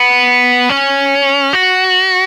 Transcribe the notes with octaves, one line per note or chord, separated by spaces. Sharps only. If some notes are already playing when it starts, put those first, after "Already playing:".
Already playing: B3
C#4
F#4